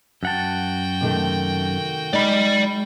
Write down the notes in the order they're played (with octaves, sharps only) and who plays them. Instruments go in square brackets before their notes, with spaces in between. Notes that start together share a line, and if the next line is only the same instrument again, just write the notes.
[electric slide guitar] F#2 F#5 A5 [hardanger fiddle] F#4 G5
[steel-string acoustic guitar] C3 D#3 A3
[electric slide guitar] G#3 [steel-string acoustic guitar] D#4 [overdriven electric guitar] D5 B5